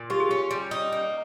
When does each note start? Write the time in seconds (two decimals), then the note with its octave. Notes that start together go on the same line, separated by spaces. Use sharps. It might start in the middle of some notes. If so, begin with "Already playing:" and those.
Already playing: A#2
0.10 F4 G4
0.20 G#4
0.29 C#4 G4
0.51 G3
0.71 D#4
0.93 A#3